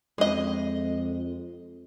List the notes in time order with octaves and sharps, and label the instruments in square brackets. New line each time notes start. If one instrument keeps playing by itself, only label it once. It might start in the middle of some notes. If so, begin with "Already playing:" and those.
[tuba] F2 [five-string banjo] G#3 D#5